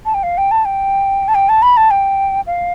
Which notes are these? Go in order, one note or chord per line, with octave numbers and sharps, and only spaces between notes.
A5
G5
F5
G5
A5
G5
A5
G5
A5
B5
A5
G5
F5